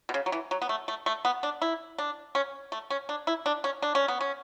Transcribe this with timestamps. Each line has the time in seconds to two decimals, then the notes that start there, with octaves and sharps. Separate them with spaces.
0.09 B2
0.14 C#3
0.26 F#3
0.32 E3
0.51 F#3
0.62 B3
0.69 A3
0.88 A3
1.06 A3
1.25 B3
1.43 D4
1.62 E4
1.98 D4
2.35 C#4
2.72 A3
2.90 C#4
3.09 D4
3.27 E4
3.46 D4
3.64 C#4
3.82 D4
3.95 C#4
4.08 B3
4.21 C#4